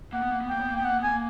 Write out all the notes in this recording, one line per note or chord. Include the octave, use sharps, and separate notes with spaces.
A#3 F#5
B3
A#3
B3
A#3 G5
B3
A#3
G5
B3
A#3 F#5
B3 G#5
A#3